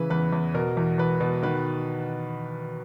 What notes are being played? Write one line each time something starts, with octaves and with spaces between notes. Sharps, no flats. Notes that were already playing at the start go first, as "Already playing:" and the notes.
Already playing: C#3 E3 B4
E2 B4
E2
B2 A#4
E2
E2 B4
B2
D#3 B4